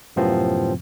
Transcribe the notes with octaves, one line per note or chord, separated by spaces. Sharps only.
F#2 A2 C3 F3 B3 C4